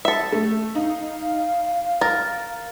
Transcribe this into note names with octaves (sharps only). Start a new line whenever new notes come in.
A4 E5
A3
D#4 F5
A#4 A6